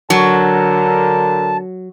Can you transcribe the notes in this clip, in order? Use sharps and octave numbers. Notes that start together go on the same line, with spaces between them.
D3 F#3 A#4 A5